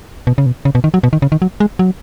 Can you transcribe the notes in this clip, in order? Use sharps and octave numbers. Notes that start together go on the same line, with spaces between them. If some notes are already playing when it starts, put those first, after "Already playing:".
B2
C#3
B2
C#3
B2
D#3
F#3
B2
D#3
C#3
D#3
F#3
G#3
F#3